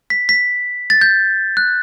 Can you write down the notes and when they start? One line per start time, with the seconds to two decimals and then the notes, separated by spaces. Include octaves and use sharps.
0.10 B6
0.29 B6
0.90 A6
1.01 G6
1.57 F#6